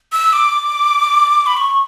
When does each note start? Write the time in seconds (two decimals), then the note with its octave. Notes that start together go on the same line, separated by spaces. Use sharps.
0.12 E6
0.33 D6
1.46 B5
1.57 C#6